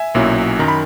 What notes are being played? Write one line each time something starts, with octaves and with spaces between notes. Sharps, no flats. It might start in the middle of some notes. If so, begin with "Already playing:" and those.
Already playing: E5 G#5
B1 A#2 F#3 C#4 E4
F#2 D#3 A#5
B5